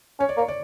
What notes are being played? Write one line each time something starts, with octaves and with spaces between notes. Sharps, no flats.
C#4 C#5
D5
A#3 C#5
D5